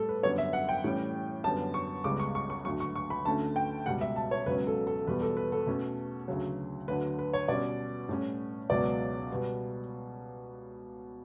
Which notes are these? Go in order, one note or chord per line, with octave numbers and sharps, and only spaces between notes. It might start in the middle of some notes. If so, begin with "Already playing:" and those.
Already playing: A2 G3 A4
B4
F#2 D3 G3 B3 C#5
E5
F#5
G5
A2 E3 G3 C#4
F#2 D3 G3 B3 A5
C#6
C#2 C#3 G3 B3 D6
C#6
C#6
C#6
D2 D3 F#3 C#6
C#6
C#6
B5
D2 D3 A3 C#4 A5
G5
C#2 B2 G3 F#5
E5
A5
C#5
C#2 B2 F#3 C#4 B4
A4
A4
E2 B2 G3 B3 B4
A4
B4
A4
B2 A3 C#4
D2 C#3 F#3
D2 D3 F#3 B4
B4
C#5
B2 G3 C#4 D5
A2 G3 C#4
C#2 B2 F#3 B3 D5
B2 G3 B3